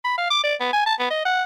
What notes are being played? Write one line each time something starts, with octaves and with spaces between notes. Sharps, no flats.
B5
F5
D6
D5
B3
G#5
A5
B3
D#5
F#5